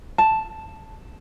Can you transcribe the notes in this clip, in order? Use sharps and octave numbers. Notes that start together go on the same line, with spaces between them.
A5